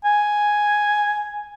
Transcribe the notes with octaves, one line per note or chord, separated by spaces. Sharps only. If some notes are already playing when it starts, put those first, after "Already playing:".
G#5